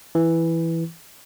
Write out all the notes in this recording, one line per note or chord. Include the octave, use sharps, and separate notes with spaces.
E3